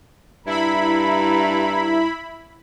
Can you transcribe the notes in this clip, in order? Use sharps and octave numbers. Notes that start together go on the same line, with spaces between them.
G2 E4 A#5 B5